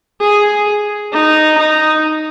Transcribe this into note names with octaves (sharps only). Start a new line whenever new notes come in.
G#4
D#4
D#4